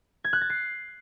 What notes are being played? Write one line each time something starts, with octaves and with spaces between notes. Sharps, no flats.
G#6
F#6
A6
C7